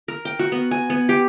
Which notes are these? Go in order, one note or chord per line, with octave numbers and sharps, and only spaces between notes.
A#4
G5
F#4
B3
G#5
B3
G4